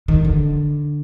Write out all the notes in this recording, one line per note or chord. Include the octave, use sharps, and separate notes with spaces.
D#3
D3